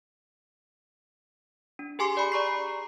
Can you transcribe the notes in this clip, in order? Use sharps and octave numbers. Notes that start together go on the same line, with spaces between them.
D4
G4 G#4 G#5 C6 D6 C7
D5 G#5 B5
D5 A#5 C#6 C7